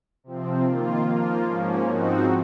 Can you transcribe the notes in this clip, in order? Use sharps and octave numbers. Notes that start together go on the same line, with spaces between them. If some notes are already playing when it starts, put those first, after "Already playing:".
C3 F3 C4
D#3 A#3 F4
F3 A#3 F4
G#2 F3 A#3 C#4
G#2 F3 C4 D#4 F#4